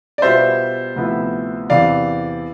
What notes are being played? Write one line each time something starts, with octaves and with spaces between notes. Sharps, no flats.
D5
B2 G3 B3 F4 C5 E5
D2 C3 F3 B3 E4
E2 C3 E3 D5 F5